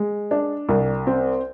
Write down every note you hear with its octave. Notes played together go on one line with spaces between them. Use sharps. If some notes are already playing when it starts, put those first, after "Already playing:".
Already playing: G#3
D4
C2
C4